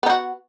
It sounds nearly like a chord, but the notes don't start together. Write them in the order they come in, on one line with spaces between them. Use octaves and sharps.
B3 D#4 F#4